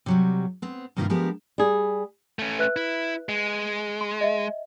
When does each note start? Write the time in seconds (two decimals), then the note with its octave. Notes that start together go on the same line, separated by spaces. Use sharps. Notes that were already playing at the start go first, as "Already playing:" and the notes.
0.06 C3 F#3 G3
0.62 B3 C4
0.97 G2 C3 D#3 A#3 E4 F4
1.10 F3 G#3 B3 D4 G4 A#4
1.58 G3 G#4
2.39 A3 C#4
2.59 B4 E5 F#6
2.76 E4
3.29 G#3
4.01 C6
4.21 D#5 E5